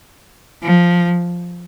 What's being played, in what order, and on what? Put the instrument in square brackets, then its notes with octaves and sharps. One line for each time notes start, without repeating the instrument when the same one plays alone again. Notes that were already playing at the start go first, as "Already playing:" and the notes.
[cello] F3